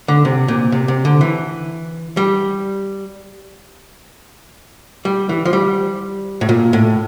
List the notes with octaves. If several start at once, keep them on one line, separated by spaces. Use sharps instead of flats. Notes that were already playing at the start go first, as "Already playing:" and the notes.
D3
C3
A#2
C3
C3
D3
E3
G3
G3
E3
F3
G3
A2
A#2
A2